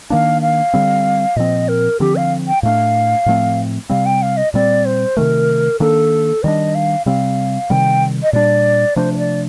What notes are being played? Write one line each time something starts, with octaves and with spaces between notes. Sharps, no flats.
D#3 A#3 D4 F5
F5
D3 G3 C4
A#2 F3 C4 D#5
A#4
D3 F3 C4 G4
F5
G5
A2 A3 D4 F5
A2 F3 A3 C4
C3 G3 C4 F5
G5
F5
D#5
A#2 G3 C4 D5
C5
C3 D#3 A3 A#4
D#3 A#3 D4 A4
D#3 G3 D4 D#5
F5
C3 G3 C4 F5
C3 D#3 G3 G5
D#5
A#2 G3 D4 D5
C3 F3 A3 D4 C5
C5
D5